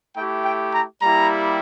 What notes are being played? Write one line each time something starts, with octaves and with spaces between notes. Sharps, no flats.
A3 E4 G4 G5
G5
A#5
G3 A#3 E4 G4 A#5